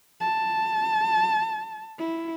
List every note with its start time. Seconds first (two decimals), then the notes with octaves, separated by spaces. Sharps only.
0.21 A5
1.99 E4